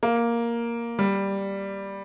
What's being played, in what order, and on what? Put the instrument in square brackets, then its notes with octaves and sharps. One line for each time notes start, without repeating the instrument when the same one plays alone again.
[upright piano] A#3
G3